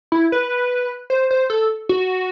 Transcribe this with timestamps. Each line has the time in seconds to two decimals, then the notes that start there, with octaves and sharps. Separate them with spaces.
0.12 E4
0.32 B4
1.10 C5
1.31 C5
1.50 A4
1.89 F#4